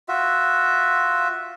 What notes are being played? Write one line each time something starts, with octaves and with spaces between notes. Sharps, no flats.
F4 F#4 E5